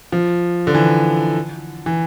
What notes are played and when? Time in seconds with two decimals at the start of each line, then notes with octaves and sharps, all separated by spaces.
0.12 F3
0.67 D3
0.75 E3
1.86 E3